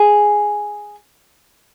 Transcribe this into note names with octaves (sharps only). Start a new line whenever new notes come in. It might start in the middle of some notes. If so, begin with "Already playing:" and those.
Already playing: G#4